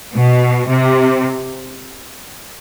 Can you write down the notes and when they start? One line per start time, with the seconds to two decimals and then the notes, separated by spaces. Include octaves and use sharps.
0.15 B2
0.68 C3